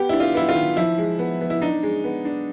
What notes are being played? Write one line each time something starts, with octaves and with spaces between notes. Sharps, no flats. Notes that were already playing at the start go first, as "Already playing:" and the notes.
Already playing: B3 G4
D4 E4
F4
B3 E4
F4
D#3
F3 E4
G#3
B3
B3
E4
D4 D#4
G#3
B3
D4